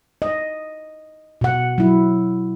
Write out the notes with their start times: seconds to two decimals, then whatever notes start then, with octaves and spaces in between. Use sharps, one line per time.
0.22 D#5
1.41 B2 F#5
1.78 F#3 E4